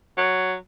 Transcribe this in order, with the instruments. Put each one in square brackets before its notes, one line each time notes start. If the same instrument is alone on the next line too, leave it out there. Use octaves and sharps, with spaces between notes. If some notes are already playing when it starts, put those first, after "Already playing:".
[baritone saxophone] F#3